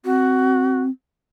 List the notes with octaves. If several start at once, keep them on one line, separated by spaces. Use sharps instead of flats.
C4 F#4